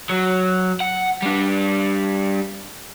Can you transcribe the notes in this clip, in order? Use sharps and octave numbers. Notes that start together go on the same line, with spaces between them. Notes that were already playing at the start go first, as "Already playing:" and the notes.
F#3
F#5
G3 D4